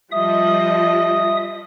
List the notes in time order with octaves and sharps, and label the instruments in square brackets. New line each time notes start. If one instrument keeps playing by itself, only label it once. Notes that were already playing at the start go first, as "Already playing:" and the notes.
[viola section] F3 G3 D#5 [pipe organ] E5 D#6